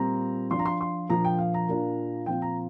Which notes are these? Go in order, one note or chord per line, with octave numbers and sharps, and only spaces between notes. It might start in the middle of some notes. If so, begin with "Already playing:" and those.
Already playing: A#2 G3 C4 F4 A#5
F3 D4 F4 C6
A#5
C6
C6
A#2 F3 D4 F4 A#5
G5
F5
A#5
A#2 A#3 D4 F4
A#2 F3 C4 F4 G5
A#5